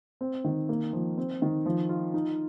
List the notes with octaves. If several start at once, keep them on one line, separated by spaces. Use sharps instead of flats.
C4
D#3
A#3
F3
C4
D#3
F3
F4
D#4